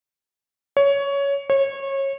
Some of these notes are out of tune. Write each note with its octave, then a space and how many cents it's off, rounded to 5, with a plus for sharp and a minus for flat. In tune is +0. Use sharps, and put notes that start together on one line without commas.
C#5 +15
C#5 -25